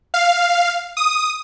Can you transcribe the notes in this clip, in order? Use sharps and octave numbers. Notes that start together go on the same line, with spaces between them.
F5
D#6